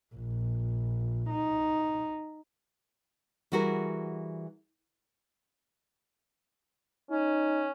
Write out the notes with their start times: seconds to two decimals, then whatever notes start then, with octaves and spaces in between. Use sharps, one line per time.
0.15 A#1
1.30 D#4
3.52 E3 G3 F#4 G#4 A#4
7.11 C#4 D#4